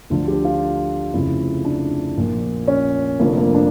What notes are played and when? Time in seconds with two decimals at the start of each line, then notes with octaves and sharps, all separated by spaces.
0.10 D2 D3 F3
0.28 G4
0.45 F4
1.13 F1 F2 C#3 F3 E4
1.65 D4
2.17 A#1 A#2 F3
2.68 C#4
3.20 F1 F2 D3 F3 A#3
3.37 A#3
3.54 D4